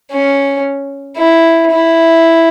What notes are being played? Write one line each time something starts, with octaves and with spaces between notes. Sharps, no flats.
C#4
E4
E4